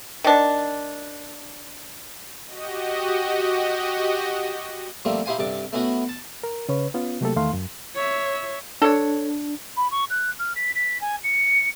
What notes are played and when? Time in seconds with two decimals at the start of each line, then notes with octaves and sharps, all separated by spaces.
0.24 D#3 D4
2.46 F#4 G4 D#5
5.05 F3 G3 A3 A#3 C4
5.26 D#4 E4 G4 C5 F5 G#5
5.38 G2 C3 A4 D6
5.73 A3 B3 C#4 E4 F#4
6.09 A5
6.43 A#4
6.69 C#3 C#4 B4 C#5
6.94 B3 C#4 F4
7.21 C3 F#3 A3 A#3 G4 A4
7.36 E2 D#3 A3 F5 C6
7.53 F#2
7.95 C#5 E5
8.82 D4 A4 C#5
9.77 B5
9.91 C#6
10.10 F#6
10.39 F6
10.55 B6
10.75 B6
11.01 G#5
11.23 C#7